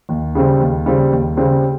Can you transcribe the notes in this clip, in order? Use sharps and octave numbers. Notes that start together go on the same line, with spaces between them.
D#2
C#3 G3 C4
D#2
C#3 G3 C4
D#2
C#3 G3 C4